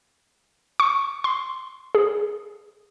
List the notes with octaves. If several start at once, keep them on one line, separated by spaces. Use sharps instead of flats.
C#6
C6
G#4